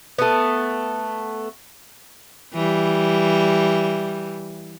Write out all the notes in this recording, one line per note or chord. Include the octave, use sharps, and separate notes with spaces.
A3 B3
E3 G3